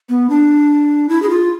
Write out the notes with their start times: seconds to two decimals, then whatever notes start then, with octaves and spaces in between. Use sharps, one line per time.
0.09 B3
0.30 D4
1.09 E4
1.22 G#4
1.29 F4